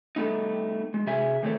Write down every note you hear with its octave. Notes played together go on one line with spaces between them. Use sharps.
G3 A3 B3 D#4
G#3
C3 G#4 E5 G#5
E2 A2 D#3 A3 C4 C#5